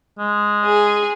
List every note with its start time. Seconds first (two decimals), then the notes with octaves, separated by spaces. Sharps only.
0.19 G#3
0.65 G#4